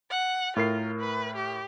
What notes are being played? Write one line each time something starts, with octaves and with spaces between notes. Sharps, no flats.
F#5
A2 F4 A#4 C7
B4
G4